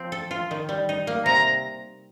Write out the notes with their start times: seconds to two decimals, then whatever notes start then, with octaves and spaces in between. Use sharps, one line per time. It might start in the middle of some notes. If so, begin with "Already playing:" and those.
Already playing: F3 C4
0.12 A4
0.31 F4
0.51 D#3
0.69 G3
0.89 D#4
1.07 A#3
1.26 C3 A#5